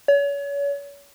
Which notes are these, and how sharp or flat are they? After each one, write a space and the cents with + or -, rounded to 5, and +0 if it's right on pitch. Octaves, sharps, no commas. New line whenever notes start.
C#5 +35